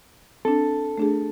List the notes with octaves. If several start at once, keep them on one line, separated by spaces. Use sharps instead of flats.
C4 D4 A4
A3 D4 G#4